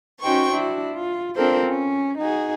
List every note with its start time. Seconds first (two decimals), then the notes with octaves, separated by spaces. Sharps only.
0.22 C#4 D#4 F#4 C5 G5 C#6
0.51 D4 E4 F#4
0.93 F4
1.35 C4 D4 F4 A4 A#4 C5
1.67 C#4
2.18 D#4 F#4 G#4